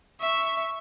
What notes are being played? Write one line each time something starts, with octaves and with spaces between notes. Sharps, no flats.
E5 C#6